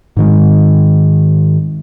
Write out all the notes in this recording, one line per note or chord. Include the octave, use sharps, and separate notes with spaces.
G#2 D#3 G#3